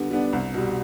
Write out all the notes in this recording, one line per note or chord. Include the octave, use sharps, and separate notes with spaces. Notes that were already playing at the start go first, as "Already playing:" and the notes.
Already playing: D3 G3 B3 D4
G3 B3 D4
C2
B2 G3